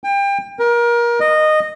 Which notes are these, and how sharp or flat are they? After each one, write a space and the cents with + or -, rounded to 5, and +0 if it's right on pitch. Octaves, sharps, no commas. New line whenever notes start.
G5 +30
A#4 +25
D#5 -15